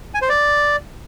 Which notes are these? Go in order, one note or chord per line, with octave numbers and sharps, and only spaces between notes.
G#5
C5
D5